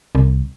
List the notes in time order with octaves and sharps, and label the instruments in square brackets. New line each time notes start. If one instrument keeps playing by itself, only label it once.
[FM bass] C2